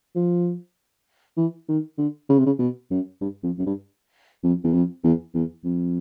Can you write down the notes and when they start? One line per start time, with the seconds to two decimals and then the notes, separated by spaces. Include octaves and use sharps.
0.16 F3
1.37 E3
1.69 D#3
1.98 D3
2.29 C#3
2.39 C3
2.46 C#3
2.59 B2
2.91 F#2
3.21 G2
3.43 F2
3.59 F#2
3.66 G2
4.43 F2
4.64 E2
4.74 F2
5.04 E2
5.34 E2
5.64 F2